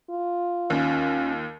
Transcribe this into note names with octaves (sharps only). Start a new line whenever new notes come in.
F4
D#2 C#4